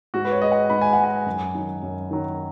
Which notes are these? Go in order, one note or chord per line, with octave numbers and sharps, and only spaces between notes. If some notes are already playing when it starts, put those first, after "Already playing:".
G#2 F#4
B4
C#5
G#3 D#5
F#5
G#2 B5
G#5
G#3 F#5
G#5
F#2
D#3 F#3
F#2
D#3 F#3